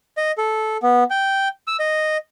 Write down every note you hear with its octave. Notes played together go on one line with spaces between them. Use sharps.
D#5
A4
B3
G5
E6
D#5